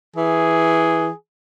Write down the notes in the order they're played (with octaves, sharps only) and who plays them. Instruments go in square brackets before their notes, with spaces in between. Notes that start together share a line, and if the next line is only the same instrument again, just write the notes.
[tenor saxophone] E3 [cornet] G#4